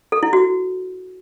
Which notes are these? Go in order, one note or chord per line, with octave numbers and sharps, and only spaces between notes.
A4
E4
F#4